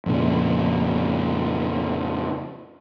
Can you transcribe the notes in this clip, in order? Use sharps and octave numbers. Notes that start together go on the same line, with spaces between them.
F2 A#2 C#3